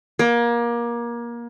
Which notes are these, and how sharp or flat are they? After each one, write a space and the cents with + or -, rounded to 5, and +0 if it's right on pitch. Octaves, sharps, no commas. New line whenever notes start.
A#3 +25